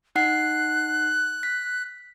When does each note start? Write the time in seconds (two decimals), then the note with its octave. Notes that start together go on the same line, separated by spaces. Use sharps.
0.16 D#4 F#5 F#6 C7
1.43 B6